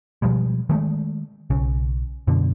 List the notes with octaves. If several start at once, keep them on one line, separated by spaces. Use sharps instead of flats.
B2 F3 G3 G#3
D#3 G#3 A3
B1 C#3
F#2 B2 D3